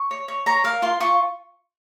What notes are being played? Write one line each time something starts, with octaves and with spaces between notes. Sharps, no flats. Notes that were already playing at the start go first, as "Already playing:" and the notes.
Already playing: C#6
C#5
C#5
C#5 A#5
A#4 F5
F4 C6
F4 C#6